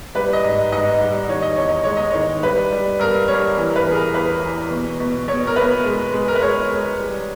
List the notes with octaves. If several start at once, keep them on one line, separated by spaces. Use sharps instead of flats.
G3 B4
D#5
G#2
G#2 D#5
G3
D#3 C#5
D#5
E2 C#5
D#5
G#3 C#5
D#5
D#3 C#5
G3 B4
G3
G2 A#4
G3 C#5
E3
A#4
B4
E3 G#4
A#4
E2 B4
E3
B2
B2
B2 C#5
A#4
B2 B4
G#3
G#3
A#4
B4
G#3 C#5
G#3
G3